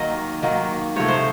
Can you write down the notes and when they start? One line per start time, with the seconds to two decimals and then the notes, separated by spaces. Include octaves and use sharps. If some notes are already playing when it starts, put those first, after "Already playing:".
Already playing: D#3 F#3 A#3 D#5
0.43 D#3 F#3 A#3
0.96 C3 F3 A3 C#5
1.08 C5